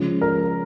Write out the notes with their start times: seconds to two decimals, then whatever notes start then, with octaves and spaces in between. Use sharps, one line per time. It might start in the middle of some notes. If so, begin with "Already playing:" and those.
Already playing: C#3 F3 G#3 C#4
0.21 A#4